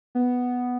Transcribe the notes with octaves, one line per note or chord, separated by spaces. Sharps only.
B3